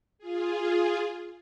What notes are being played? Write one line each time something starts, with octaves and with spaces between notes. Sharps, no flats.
F4 G#4